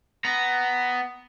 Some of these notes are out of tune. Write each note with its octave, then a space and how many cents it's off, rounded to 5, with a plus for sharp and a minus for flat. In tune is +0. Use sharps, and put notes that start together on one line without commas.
B3 +10 A#5 +0